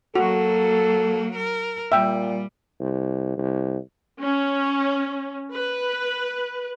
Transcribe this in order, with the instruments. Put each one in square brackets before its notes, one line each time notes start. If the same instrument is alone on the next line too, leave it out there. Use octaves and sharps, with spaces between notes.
[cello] F#3 A#3 [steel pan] F#4 [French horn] A4
[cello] A#4
[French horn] A#2 [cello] G3 [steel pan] E5 G5
[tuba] C2
C2
[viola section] C#4
B4